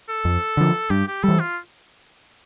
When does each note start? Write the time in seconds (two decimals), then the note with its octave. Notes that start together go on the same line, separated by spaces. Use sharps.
0.09 A4
0.25 F2
0.57 D3 F3
0.90 G2 G4
1.07 G4
1.23 E3 G3 A4
1.40 F4